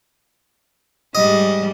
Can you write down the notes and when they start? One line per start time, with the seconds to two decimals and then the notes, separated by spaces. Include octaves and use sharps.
1.15 G#2 G3 D#5